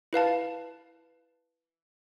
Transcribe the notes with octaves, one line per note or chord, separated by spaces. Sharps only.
E4 B4 F5 A5